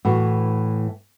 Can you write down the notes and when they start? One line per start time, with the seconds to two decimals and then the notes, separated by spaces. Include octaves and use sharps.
0.05 A2 E3 F#4